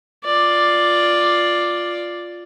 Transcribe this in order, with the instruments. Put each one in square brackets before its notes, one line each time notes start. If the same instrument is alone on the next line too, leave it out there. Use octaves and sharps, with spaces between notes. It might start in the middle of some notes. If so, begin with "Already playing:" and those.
[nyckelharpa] F4 D5